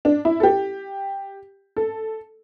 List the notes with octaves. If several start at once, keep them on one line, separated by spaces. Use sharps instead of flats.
D4
E4
A4
G4
A4